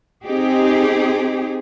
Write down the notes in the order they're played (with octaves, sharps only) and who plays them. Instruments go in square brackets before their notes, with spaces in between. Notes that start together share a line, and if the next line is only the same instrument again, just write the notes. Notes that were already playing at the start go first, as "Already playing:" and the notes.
[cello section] C4 D#4 G4 G#4